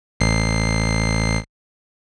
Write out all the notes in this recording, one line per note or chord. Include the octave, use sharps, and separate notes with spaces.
A1 C7